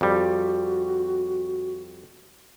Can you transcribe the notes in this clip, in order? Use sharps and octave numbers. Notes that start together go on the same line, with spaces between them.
F2 G3 F#4